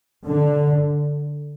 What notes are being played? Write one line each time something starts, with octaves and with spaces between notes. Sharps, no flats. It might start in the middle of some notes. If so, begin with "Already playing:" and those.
D3